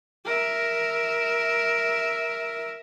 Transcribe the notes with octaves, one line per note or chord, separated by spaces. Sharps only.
A#4 E5